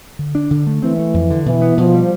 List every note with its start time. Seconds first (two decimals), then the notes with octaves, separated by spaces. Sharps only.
0.19 D3
0.35 D4
0.51 D3
0.67 A3
0.82 E3 C4
0.98 A3
1.14 F2
1.30 D3
1.45 B2 E3
1.61 B3
1.77 B2 F3
1.94 G3